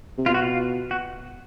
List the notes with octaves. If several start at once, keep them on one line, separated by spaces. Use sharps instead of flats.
C3
B2 F4
F#4
F4
F#4